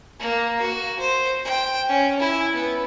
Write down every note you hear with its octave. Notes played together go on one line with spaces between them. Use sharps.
A#3
F#4
C5
G5
C#4
E4
B3